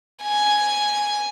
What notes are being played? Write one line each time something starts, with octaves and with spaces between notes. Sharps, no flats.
G#5